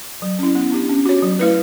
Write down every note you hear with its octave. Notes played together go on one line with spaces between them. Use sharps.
F#3
C#4 E4
B3
D4 G4
C#4
F#4 C#5
F#3
A3 E4 B4